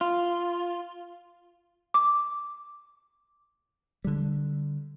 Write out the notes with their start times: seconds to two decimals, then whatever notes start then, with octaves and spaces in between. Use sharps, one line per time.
0.01 F4
1.94 D6
4.05 D3 G3